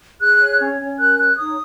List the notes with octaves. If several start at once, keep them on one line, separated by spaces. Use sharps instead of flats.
G#4 F#6
C#5
C#4
C#4
A#4 F#6
C#5 F#6
D#4 D#6